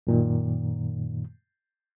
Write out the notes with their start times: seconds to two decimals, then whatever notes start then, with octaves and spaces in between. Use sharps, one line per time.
0.07 F#2 A#2 D#3